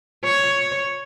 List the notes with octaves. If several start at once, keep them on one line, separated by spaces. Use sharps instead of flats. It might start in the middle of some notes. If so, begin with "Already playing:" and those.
C#5